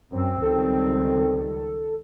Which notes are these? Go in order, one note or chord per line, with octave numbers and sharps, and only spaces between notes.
F#2 C4
C#2 D#3 G3 A4